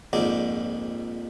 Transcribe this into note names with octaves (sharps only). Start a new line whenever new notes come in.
A#1 F2 G#2 D4